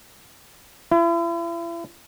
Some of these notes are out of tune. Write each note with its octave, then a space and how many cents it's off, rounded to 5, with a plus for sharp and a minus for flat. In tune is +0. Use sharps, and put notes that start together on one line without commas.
E4 +40